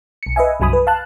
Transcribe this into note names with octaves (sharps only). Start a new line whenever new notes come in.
B1 C#7
B4 D#5 E5 G#5
C2 G2 F#3 G#5 B5 D#6
B4
F5 A5 F#6